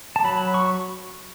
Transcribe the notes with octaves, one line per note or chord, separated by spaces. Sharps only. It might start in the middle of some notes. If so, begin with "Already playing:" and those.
A5
F#3 B5
C#6